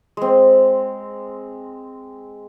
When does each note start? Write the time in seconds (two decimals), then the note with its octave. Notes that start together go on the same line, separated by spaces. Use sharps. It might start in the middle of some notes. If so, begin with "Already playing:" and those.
0.17 G#3 C4